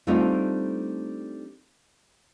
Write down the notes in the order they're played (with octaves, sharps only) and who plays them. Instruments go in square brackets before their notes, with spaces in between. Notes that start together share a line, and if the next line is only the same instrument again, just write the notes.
[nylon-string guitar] G3 A3 C4 D4 D#4 F4